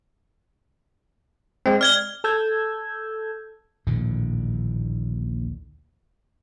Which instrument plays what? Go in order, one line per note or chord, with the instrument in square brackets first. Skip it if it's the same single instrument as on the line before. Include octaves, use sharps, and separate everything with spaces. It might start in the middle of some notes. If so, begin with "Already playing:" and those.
[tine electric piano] G#3 C4
[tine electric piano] D5 [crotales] F6 G#6 G7
[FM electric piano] A4 A5 E6 G6 G#6
[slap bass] A#1 D#2 A2 D3